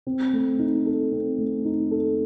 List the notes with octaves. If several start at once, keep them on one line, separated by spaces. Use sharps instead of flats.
C4
A3
D#4
A4
C4
A3
D#4
A4